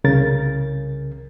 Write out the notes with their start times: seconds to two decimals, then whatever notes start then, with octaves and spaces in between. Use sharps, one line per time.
0.04 C2 C#3 A#4 A6